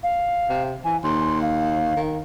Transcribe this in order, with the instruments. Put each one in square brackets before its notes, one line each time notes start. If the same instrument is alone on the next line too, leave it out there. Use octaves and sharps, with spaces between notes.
[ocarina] F5
[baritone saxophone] C3
[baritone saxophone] E3 [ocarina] G#5
[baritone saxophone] D#2 [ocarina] C6
[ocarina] F5
[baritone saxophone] D#3